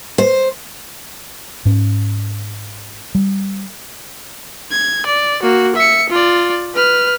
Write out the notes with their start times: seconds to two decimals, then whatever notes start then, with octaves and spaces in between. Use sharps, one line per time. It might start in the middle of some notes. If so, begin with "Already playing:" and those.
0.18 C5
1.65 G#2 C#4
3.15 G3
4.71 G#6
5.06 D5
5.43 A#3 F#4
5.76 E5 C#7
6.10 F4 D5
6.75 B4 F6